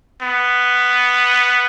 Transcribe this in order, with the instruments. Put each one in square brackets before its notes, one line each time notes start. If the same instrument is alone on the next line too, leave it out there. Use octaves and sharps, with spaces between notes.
[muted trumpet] B3